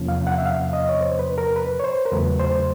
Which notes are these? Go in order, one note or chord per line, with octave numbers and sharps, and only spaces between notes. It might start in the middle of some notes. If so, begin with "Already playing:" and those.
Already playing: E2 C3 F3 A#3 C#4
F5
F#5
E5
F5
D#5
C#5
C5
B4
A#4
B4
C#5
C5
A#4
E2 C#3 F#3 A3 B4
C5